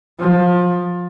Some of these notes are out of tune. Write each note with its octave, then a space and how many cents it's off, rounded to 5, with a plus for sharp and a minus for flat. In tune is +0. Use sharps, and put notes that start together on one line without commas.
F3 +20